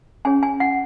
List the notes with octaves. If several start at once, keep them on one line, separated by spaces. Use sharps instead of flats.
C#4 G#4 C#5 G#5
G#5
F#5